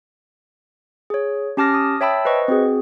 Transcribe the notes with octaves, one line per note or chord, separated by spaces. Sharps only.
G#4 C#5
C#4 G4 A5 D6 F6 A#6
D#6
C#5 E5 G5 A5 B5 E6
B4 C5 D#5 C#6
C4 F#4 G#4